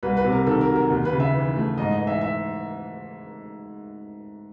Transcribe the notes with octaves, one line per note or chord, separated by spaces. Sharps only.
C2 B4
B4
C3
A#4
D#3 A4
A#4
F#3
A#4
D#2
B4
C#3
E5
E3
A3
G#2 D#5
D#5
E3
E5
E5